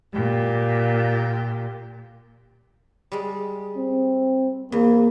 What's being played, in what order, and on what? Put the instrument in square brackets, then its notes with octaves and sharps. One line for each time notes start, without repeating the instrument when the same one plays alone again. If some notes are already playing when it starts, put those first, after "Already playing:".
[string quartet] A#2 [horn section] G4
[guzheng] G3 G#3
[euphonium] C4
[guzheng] E2 [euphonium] A#3